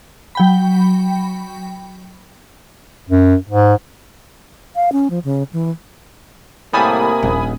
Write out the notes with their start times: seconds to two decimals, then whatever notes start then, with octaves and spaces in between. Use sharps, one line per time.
0.35 F#3 G5 B5
3.09 F#2
3.49 G#2
4.75 F5
4.92 C#4
5.10 F3
5.24 C#3
5.53 E3
6.73 A2 C3 G3 A#3 G#5 A5 B5 D#6
7.23 D#1 A#1